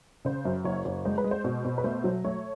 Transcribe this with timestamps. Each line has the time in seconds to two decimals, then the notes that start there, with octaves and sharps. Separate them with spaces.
0.25 C#3 C5
0.45 F#2
0.65 F#1 C#5
0.85 F#1 C#5
1.05 G#3 C5
1.18 B4
1.24 G#3
1.31 C5
1.44 B2 C5
1.65 B2
1.78 B4
1.84 A3 C5
2.04 F#3
2.24 A3 C#5